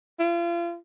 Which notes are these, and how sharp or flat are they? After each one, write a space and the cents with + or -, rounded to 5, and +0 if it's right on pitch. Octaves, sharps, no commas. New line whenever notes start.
F4 -35